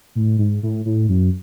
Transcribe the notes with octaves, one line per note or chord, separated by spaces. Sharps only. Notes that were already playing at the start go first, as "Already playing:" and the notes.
A2
G#2
A2
A2
F#2